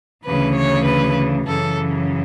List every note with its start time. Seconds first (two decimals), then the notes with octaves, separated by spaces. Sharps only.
0.25 D2 C#3 E3 B4
0.55 C#5
0.85 B4
1.45 F#2 C#3 E3 A4